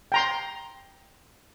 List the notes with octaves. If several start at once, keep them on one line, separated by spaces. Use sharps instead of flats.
G5 A#5 C6